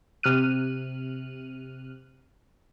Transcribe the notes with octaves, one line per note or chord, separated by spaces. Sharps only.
C3 F6 F#6 D#7